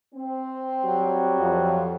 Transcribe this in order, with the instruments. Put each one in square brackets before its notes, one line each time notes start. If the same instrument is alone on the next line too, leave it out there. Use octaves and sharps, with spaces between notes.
[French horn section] C4
[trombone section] F#3 G3 F#4
[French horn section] F2